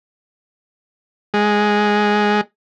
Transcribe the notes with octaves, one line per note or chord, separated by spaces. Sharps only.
G#3